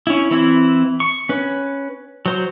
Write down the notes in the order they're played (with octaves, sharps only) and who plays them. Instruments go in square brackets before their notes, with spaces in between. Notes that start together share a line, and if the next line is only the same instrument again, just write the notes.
[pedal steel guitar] C#4 E4
E3 C4 E4
C#6
C#4 B4
F#3 C5